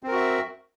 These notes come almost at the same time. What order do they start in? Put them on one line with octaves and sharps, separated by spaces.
C4 A#4 F#4 E5